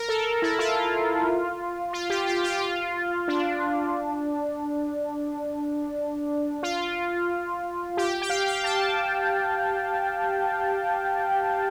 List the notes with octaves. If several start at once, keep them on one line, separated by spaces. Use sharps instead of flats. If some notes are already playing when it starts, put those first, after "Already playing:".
Already playing: A#4
A4
E4
F4
F4
G4
G4
F4
D4
F4
G4
G4
G5
F5
G5
A5